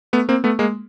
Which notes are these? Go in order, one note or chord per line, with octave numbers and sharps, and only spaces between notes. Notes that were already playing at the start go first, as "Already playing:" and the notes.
A3 B3
A#3 C4
A3 B3
G#3 A#3